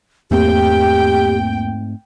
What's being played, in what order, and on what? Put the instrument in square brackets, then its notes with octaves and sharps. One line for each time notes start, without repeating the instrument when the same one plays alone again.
[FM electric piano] E2 A#3 [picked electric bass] G#2 A3 C4 [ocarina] G4 [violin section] G5